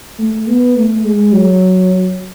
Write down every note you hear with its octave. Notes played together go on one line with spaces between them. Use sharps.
A3
B3
A3
G#3
F#3